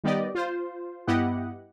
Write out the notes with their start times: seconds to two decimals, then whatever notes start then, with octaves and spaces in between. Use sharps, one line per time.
0.04 D#3 G3 B3 G4 D5 D#5
0.35 F4 C5
1.07 G2 B3 E4 G4 D#5 F#5